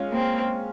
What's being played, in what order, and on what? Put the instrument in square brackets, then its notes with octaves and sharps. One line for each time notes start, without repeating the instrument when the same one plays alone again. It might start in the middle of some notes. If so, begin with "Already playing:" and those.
Already playing: [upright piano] G#3 C#4 F4
[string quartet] A#3 C4